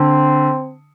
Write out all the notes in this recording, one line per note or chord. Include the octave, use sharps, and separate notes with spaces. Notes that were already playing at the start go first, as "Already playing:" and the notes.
Already playing: D3 C4